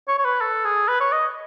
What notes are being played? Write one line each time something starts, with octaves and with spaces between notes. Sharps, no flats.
C#5
C#5
B4
A4
G#4
B4
C#5
D#5